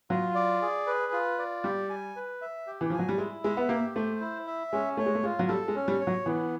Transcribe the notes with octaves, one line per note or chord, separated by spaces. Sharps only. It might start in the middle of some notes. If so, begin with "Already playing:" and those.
F#3 F4
D5
G#4
B4
F4
D5
G3 G4
G#5
B4
E5
G4
E3
F3 G#5
F#3
G3
G#3 E4
G#3 E5
B3
A#3 G4
A3 C5
E4
E5
G#3 C#4
A3 C#5
G#3
A3
G#3 F4
F#3
G3 A4
G#3
C#4
G3
C#5
F#3
E3 B3